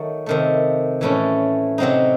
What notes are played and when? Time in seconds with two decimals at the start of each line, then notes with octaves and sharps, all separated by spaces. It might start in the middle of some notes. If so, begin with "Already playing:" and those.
Already playing: D#3 F#3 A3
0.26 C3 D#3 A3
1.01 A2 E3 A3 C#4
1.78 C3 F#3 C4 D#4